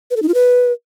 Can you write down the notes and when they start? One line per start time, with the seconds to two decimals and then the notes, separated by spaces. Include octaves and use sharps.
0.11 B4
0.17 A4
0.22 D#4
0.28 F4
0.34 B4